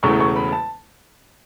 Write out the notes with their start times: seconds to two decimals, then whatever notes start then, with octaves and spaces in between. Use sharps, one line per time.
0.03 E1 E2 C#3 E3 A3 C#6
0.20 C#6
0.36 B5
0.52 A5